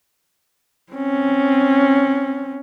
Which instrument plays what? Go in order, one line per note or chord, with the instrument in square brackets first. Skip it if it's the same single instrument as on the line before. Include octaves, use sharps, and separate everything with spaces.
[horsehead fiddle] C4 C#4